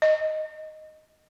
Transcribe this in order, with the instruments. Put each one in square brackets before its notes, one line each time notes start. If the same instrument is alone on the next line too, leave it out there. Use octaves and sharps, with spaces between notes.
[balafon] D#5